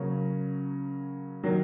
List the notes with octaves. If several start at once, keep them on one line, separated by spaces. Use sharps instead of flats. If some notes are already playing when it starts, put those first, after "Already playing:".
Already playing: C#3 F#3 A#3 C#4
D#3 F#3 A#3